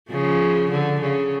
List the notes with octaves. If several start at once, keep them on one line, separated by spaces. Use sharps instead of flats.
C#3 F3
D3
C#3